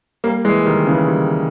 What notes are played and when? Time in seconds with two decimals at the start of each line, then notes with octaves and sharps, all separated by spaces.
0.24 G3 A#3
0.45 E3 G#3
0.65 D#3 G3
0.86 C#3 E3
1.07 D#3 G3